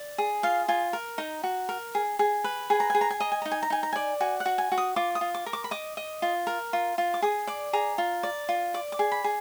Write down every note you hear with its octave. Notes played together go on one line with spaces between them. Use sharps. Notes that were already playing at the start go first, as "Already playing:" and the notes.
Already playing: D5
G#4
F4 F5
F4 G#5
A#4
D#4 A#5
F#4
A#4
G#4
G#4
B4
G#4 G#5
A#5
G#4 G#5
A#5
G#5
D#5 A#5
G#5
D#4 A#5
G#5
A#5
D#4 G#5
A#5
D5 G#5
F#4 G#5
F#5
F#4
G#5
F#4
D#6
F4 D6
D#6
F4
D6
A#4
D6
B5
D#5 D6
D#5
F4
A#4
F4
F4
D6
G#4 D#6
D5 D6
G#4 A#5
F4
D5
F4
D5 D6
D6
G#4
B5
G#4